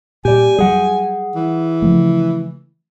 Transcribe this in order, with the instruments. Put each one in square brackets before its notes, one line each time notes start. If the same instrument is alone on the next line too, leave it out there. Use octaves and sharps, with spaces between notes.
[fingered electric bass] A#2 [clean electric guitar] G4 D5 [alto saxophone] G#5
[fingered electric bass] F#3 G3 [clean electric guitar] G#4 F#5
[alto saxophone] E3
[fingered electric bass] C#3 F3 A3